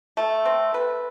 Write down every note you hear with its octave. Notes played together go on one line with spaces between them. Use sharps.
A3
C4
B4